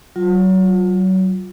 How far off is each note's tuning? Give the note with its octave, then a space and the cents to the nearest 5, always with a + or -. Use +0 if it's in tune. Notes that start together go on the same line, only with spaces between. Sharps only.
F#3 +25 F4 +25